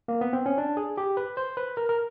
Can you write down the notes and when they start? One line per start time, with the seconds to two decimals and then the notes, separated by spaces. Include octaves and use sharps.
0.08 A#3
0.21 B3
0.33 C4
0.46 C#4
0.58 D4
0.77 G#4
0.98 G4
1.17 B4
1.37 C5
1.57 B4
1.77 A#4
1.89 A#4